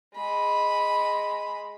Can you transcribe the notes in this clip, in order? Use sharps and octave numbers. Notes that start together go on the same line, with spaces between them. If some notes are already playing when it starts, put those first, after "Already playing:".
G#3 B5